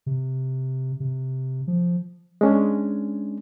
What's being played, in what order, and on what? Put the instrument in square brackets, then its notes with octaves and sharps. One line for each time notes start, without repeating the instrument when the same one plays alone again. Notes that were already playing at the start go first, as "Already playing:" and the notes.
[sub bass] C3
C3
F3
[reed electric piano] G#3 C#4 D4